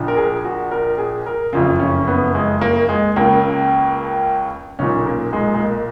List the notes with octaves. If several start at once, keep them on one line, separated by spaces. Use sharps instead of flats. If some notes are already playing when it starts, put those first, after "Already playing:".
Already playing: A#1 A#2
A#4
G#4
F#4
A#4
G#4
A#4
F#1 F2 C#3 F4
C#4
B3
G#3
A#3
G#3
C#2 C#3 A#3
B1 A#2 C#4
A#3
G#3
G#3
A#3